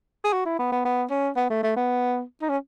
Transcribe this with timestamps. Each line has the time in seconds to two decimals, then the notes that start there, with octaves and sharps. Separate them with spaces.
0.24 G#4
0.33 F#4
0.46 E4
0.59 B3
0.72 B3
0.85 B3
1.10 C#4
1.36 B3
1.50 A3
1.63 A3
1.76 B3
2.42 D#4
2.49 C#4